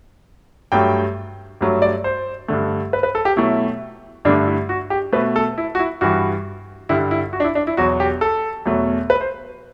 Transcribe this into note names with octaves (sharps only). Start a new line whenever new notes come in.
G2 F#3 A3 G5
G2 F#3 A3
D5
C5
G2 D3 A3
B4
B4
A4
G4
B2 F#3 A3 E4
G2 D3 A3 D4
E4
F#4
G4
B2 A3 B4
A4
E4
F#4
E4
G2 E3 G3 F#4
G2 D3 G3 E4
E4
F#4
D4
E4
D4
E4
E2 B2 F#3 F#4
G4
A4
E2 B2 F#3 A3
B4
C5